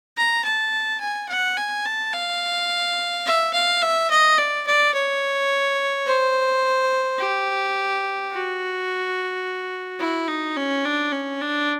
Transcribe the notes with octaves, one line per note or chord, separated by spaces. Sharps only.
A#5
A5
G#5
F#5
G#5
A5
F5
E5
F5
E5
D#5
D5
D5
C#5
C5
G4
F#4
E4
D#4
C#4
D4
C#4
D4